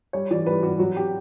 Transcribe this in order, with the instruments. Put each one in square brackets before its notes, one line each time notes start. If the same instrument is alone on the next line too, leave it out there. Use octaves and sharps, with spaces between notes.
[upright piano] G3 C#5
E3 D5
G3 B4
G3 F#4
F#3 F#4
G4